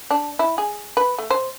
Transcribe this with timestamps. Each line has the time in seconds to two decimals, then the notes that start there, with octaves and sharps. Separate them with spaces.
0.11 D4
0.39 E4
0.58 G#4
0.97 B4
1.18 A3
1.30 C5